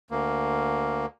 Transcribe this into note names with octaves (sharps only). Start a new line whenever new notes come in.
D2 A#3